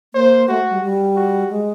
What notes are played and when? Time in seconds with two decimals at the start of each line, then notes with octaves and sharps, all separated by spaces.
0.14 A#3 C5
0.48 A3 F#4
0.70 G3
0.83 G3
1.16 F#4
1.50 G#3